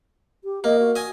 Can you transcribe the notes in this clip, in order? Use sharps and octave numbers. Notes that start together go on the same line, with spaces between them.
G4
A#3 D#5
F#4
D#5 G#5